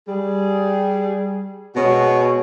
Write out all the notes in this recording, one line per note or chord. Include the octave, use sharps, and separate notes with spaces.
G3 G#4
B2 G#3 F#4 G#4 C#5